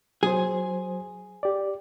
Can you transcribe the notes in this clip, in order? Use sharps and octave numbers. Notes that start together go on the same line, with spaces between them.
F#3 G#4 C5
G4 D5